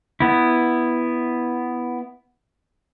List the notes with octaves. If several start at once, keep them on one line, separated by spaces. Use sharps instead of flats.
B3 E4